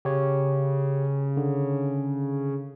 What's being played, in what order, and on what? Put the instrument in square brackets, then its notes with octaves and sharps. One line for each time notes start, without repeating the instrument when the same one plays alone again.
[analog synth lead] C#3 [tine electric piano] G4 C#5
[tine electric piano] D3